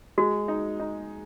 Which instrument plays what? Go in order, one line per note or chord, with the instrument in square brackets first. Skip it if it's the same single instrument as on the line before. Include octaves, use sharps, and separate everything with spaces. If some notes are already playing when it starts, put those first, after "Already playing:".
[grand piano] G#3 [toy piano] F#4
[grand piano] D#4
D#4